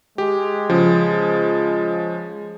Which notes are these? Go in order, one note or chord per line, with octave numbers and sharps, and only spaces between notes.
G#3 G4
C#3 F3